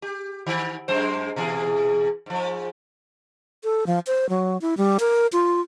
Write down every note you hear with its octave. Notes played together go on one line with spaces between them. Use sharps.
G4
D#3
F#2 G#3 C5
B2 E3 G#4
G#2 F3
A4
F3
C5
F#3
E4
G3
A#4
F4